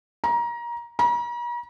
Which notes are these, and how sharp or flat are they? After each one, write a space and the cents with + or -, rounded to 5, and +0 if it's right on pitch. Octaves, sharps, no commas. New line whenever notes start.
A#5 +25
A#5 +45